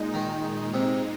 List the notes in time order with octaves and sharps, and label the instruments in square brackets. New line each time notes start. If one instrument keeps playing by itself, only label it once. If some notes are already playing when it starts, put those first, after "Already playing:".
Already playing: [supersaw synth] A#2 G#3 D#4
[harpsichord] D#3
C3